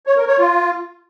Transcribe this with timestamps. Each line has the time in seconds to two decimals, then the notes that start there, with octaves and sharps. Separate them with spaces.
0.06 C#5
0.17 A#4
0.27 C#5
0.38 F4